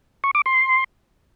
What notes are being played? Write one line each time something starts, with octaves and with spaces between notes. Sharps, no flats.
C#6
D6
C6